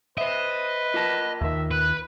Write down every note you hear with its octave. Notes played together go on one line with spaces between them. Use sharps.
B4 C5 D#5 E5
F4 A#4 A5
D#2 D#3 E5
B4 F#6